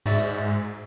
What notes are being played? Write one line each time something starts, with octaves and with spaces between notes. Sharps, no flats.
G#2 F#4 D5 E5